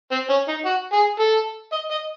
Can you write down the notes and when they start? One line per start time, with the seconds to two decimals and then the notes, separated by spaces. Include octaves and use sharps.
0.12 C4
0.30 C#4
0.48 D#4
0.65 F#4
0.93 G#4
1.20 A4
1.73 D#5
1.91 D#5